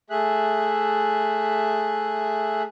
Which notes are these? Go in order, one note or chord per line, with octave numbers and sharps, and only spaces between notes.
A3 G#4 E5 F#6